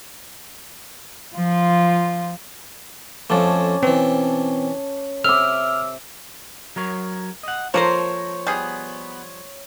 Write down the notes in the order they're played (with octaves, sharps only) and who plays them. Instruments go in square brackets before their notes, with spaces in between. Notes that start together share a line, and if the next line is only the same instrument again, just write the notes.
[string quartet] F3 F4
[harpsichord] F2 F3 A3 [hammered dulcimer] C#4 A5 D6
[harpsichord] B2 E3 [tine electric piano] C4
[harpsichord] C3 [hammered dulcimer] E5 D6 [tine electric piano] F6
[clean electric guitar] F#3 A#4 C#5
D#5 F#5
[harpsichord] F3 [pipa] A#3 A4 C5 [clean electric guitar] A#4 A5 A#5 [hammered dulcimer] C#5
[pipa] G3 G#4 [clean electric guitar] B3